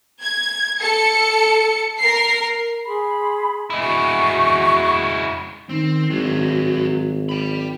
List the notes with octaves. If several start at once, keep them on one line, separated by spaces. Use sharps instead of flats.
G#6
A4 C#7
A#4 C7
G#4 B5 C6
G#3 E4 D#5
F#4 C#6
D#3 C4
G#1 F#3 D4
G5 B5